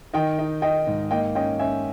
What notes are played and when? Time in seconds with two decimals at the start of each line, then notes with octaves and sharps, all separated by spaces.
0.14 D#3 D#5 G5
0.39 D#4
0.62 D#4 D#5 G5
0.87 G#2
1.11 A#3 D#5 G5
1.35 C#4 D#5 G5
1.59 C#4 E5 G#5